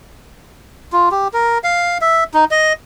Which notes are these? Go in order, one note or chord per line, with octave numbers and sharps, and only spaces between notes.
F4
G4
A#4
F5
E5
D#4
D#5